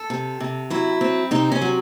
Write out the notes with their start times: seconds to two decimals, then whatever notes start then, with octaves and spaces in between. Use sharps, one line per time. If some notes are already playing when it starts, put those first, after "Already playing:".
Already playing: A4
0.10 C3
0.40 C3
0.70 F#3 E4
1.01 C4
1.31 C3 D#4
1.52 C#4
1.62 F#3